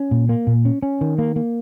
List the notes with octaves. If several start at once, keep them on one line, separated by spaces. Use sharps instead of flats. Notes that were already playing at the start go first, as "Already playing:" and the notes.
Already playing: C#4
A#2
A#3
A#2
C#4
C#4
D#3
A#3
A#3